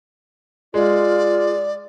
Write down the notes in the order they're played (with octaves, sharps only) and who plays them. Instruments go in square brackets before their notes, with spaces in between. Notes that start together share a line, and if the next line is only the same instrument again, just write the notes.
[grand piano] G#3 [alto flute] F4 [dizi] D5